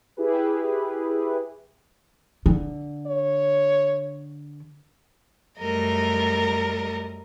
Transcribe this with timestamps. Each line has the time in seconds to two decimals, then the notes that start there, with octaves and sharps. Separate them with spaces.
0.17 E4 G4 G#4 B4
2.46 D3
3.07 C#5
5.59 F#2 G3 A3 A#4 D#5